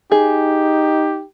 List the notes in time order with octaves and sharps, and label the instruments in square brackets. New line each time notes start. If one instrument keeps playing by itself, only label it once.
[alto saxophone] D#4 [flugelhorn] G4 [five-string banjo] G#4